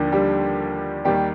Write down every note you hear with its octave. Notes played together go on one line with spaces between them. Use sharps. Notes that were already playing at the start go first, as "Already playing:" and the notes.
Already playing: D#2 D3 F3
G3 G4
D#2 D#3 G3 G4